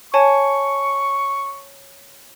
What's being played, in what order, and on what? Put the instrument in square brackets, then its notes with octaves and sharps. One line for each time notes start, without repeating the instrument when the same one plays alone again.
[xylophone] C#5 G#5 A5 [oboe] C#6